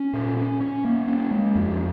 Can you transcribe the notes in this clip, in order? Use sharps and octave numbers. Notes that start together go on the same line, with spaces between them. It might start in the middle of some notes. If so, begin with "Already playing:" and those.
Already playing: C#4
A#2
C#4
C#4
A#3
C#4
G#3
F2